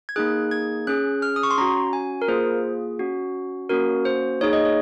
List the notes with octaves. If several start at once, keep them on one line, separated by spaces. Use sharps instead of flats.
G#6
A#3 D#4 G#4 F#6
G#6
C#4 G#4 F#6
F6
D#6
C#6
C6
C#4 F#4 A#5
G#5
A#4
A#3 F4 G#4 C5
C#4 F#4
A#3 C#4 F#4 A#4
C5
A#3 D#4 G#4 C#5
D#5
C#5